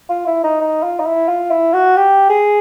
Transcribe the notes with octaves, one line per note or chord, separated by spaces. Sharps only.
F4
E4
D#4
D#4
F4
D#4
E4
F4
E4
F#4
G4
G#4